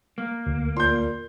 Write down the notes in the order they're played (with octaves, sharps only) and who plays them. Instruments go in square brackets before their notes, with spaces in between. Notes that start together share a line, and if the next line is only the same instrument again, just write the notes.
[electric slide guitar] A#3
[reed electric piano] D2
[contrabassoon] A#2 [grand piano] C6 G6